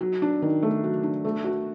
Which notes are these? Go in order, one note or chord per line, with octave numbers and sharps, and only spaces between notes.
F#3
D4
D#3
A3
F#3
D4
A3
F#4